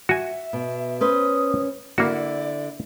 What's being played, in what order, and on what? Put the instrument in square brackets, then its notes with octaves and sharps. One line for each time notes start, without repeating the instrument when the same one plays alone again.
[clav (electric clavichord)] F#4 G#5 [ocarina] E5
[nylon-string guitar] B2
[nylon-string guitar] C#4 B4 C5 [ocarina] D#6
[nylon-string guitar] D3 E4 [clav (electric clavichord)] A#3 F#4 [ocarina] D5